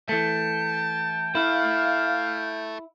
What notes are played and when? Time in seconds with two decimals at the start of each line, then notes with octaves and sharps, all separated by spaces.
0.09 E3 A3 G5 A5
1.35 E4 A4 E5 F5 F6